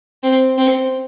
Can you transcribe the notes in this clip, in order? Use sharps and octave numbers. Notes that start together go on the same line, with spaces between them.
C4
C4